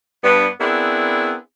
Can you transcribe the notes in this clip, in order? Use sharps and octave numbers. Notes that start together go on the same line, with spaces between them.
G2 B3 D4
B3 C4 D4 E4 G#4 A#4